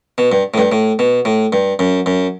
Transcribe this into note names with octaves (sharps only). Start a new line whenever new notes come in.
B2
G2
A2
G2
A2
B2
A2
G2
F#2
F#2